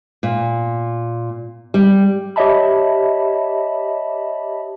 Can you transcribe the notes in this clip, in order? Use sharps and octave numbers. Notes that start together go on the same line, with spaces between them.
A#2
G3
G4 C#5 D#5 E5 A5 B5